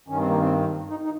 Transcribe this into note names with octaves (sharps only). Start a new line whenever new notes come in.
G2 D#3 C#4
C4
A#3
C4
D#4
D#4